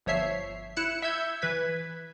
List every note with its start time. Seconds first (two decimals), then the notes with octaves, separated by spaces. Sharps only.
0.06 G1 F3 C#5 E5 C7
0.76 E4 F#6 C#7 E7
1.02 E5 E6 G6 G#6
1.42 E3 B4 G#6 B6